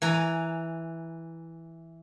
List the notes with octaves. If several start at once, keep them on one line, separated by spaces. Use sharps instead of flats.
E3 G#5 A#5